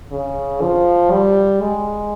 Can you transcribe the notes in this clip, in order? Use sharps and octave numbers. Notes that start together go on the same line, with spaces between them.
C#3
F3
G3
G#3